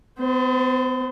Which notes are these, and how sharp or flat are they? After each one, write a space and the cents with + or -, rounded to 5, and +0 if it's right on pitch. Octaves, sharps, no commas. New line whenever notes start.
B3 +45 C5 +0